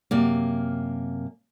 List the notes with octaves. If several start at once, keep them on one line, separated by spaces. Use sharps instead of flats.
F#2 C3 A#3